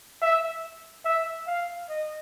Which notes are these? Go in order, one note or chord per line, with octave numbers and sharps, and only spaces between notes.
E5
E5
F5
D#5